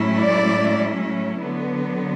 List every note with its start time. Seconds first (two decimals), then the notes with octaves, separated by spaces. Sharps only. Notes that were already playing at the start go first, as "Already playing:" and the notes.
Already playing: A2 F#3 A3 C#4 E4
0.19 D5
1.44 D3 F#3 B3